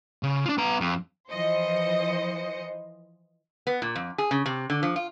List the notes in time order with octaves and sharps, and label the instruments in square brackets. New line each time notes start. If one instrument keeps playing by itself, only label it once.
[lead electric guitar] C#3
D4 F4
B3 A#5
F2
[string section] E3 F3 C5 D#5 C#7
[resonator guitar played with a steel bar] B3
A#2
F2
G#4
C#3
C3
D3
F3
F4